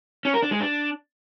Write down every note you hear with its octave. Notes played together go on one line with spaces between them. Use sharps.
C#4
A#4
D4
G#3
D4